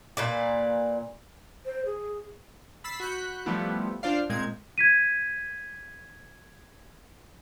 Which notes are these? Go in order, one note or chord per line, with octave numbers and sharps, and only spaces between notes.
A#2 B4 D5
C5
G#4
B5 E6 A6 B6 C7
F#4 B5 F#6 G6
F3 G3 A3 B3 E4
D4 F4 C5 D5 F5
A#2 G#3 C4 G#6
G#6 B6 D#7